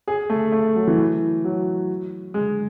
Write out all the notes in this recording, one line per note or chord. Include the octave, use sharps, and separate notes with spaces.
G#4
A3
A3
F#3
E3
F#3
G#3